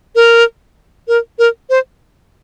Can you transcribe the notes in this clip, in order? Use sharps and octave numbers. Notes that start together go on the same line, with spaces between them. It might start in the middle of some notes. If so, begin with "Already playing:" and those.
A#4
A#4
A#4
C5